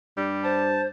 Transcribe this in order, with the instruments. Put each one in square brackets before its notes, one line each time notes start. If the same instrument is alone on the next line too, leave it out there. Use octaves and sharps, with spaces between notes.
[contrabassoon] G2 [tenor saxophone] G3
[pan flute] C5 [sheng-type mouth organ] A5